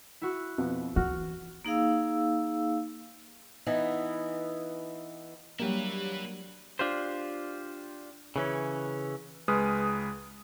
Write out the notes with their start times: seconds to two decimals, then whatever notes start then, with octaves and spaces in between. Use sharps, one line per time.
0.22 E4 F#4
0.58 F2 B2
0.96 E3 F#4 F6
1.65 A#3 D#4 G#4 F5 E6
3.66 E3 B3 D#4
5.59 F#3 G3 A#3 D4 E4 G4 B4 C#5
6.79 D4 F4 G4 C5
8.36 C#3 E3 C#4
9.48 C#2 G#3 B4 D#6 F6